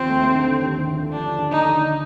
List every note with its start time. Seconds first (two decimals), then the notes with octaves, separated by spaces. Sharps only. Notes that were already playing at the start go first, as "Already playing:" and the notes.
Already playing: D#2 F3 C4
0.09 A3
0.35 D3
0.61 D#2
0.87 D3
1.13 F3 D4
1.38 D3
1.52 D#4
1.65 D3